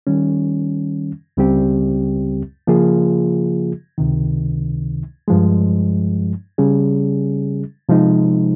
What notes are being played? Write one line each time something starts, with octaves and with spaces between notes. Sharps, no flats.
D#3 G3 C#4
C#2 C#3 G3 C4 G4
C#3 F3 A#3 F4 G#4
C#2 C3 D#3
G2 F3 G#3
C#3 G3 C#4 G#4
C3 F3 G#3 D#4